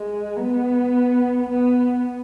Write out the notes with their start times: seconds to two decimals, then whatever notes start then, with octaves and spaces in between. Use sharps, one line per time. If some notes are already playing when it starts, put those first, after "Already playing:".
Already playing: G#3
0.38 B3
1.50 B3